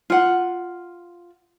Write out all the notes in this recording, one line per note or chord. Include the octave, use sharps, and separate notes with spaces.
F4 F#5